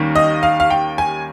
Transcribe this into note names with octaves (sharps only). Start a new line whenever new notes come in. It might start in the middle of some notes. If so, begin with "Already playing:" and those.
Already playing: D#2 D#3 G3 A#3 C#4
D#5
F5
F5
G5
G#5